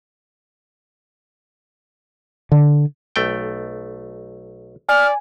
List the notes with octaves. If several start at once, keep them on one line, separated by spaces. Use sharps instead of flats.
D3
B1 A3 G5
D5 G#5 F6